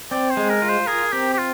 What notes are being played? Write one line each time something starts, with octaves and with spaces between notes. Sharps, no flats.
C4 D5
C5
G#3
A#4
F4
C5
G#4 A#4
C4 G4
G4
F4